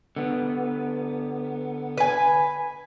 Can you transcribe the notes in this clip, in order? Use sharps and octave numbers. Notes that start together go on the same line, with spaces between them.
D3 B3
B4 G#5